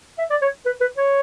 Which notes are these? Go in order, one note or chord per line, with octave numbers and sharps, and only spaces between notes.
E5
D5
C#5
B4
B4
C#5